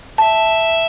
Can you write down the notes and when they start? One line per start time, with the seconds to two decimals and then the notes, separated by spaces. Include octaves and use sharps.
0.18 E5 A5